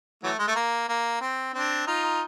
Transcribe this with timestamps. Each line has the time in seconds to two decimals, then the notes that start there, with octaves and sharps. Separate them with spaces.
0.23 E3 F#3 A3
0.39 G#3
0.48 A3
0.55 A#3
0.89 A#3
1.21 C4
1.54 C4 D4
1.87 D#4 F4